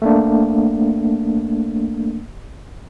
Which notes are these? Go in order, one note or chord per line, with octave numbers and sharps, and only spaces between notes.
A3 A#3 D4